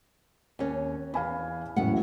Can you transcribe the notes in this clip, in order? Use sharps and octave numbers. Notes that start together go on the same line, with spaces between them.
D#2 C#4 C#5
E2 F5 G#5 B5
E1 F#2 A2 B3 F#5